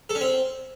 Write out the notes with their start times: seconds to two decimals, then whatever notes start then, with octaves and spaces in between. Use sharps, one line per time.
0.09 A4
0.15 C#4
0.21 C4